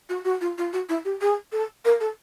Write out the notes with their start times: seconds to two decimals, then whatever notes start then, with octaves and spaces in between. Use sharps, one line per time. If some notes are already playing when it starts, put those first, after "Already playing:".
0.09 F#4
0.24 F#4
0.41 F4
0.57 F4
0.73 F#4
0.89 E4
1.05 G4
1.21 G#4
1.52 A4
1.85 A#4
2.00 A4